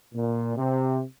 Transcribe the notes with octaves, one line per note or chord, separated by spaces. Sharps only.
A#2
C3